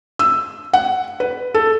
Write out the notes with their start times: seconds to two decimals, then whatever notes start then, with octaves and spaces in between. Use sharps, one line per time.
0.19 E6
0.73 F#5
1.20 B4
1.54 A4